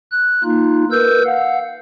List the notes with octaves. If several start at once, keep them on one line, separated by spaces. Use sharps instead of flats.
F#6
A#3 D#4 F4
A#4 B4 E6 G6
F5 F#5